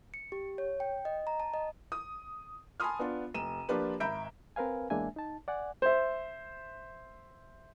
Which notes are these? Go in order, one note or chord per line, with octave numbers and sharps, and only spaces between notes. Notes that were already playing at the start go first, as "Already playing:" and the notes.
C#7
G4
C#5
G5
D#5
A#5
A5
D#5
D#6
G#5 A5 B5 C6 D#6 F6
B3 D4 F4
F1 D#7 E7
F3 A#3 D4 F4 G4 B4
G#1 E5 A#5 B5 G6 D7
C4 A#4 B4 F5 G#5
E2 G#3 A#3 D4 E5 G#5
D#4 A5
D5 F#5 G#5
C5 E5